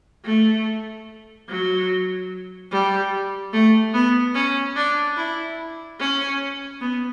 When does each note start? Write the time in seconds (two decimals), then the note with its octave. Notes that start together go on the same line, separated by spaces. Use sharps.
0.25 A3
1.49 F#3
2.72 G3
3.53 A3
3.94 B3
4.35 C#4
4.76 D4
5.17 E4
6.00 C#4
6.81 B3